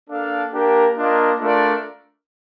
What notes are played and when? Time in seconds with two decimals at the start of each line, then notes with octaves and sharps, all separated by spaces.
0.09 A#3 D4 A4 D5 F5
0.52 A#3 D4 G4 A#4
0.96 A#3 D4 F4 A#4 D#5
1.40 A3 D4 F4 A#4 D5